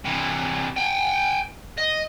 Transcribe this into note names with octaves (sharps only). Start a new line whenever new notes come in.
C3 E3
G5 G#5
D#5